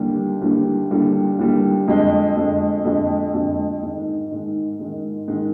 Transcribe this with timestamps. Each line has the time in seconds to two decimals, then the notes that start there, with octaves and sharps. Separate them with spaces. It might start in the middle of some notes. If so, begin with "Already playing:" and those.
Already playing: D#2 D3 G3
0.42 D#2 D3 G3
0.91 D#2 D3 G3
1.39 D#2 D3 G3
1.88 F2 D3 G#3
2.37 F2 D3 G#3
2.85 F2 D3 G#3
3.34 F2 D3 G#3
3.82 G#2 D#3 G#3
4.31 G#2 D#3 G#3
4.79 G#2 D#3 G#3
5.28 G#2 D#3 G#3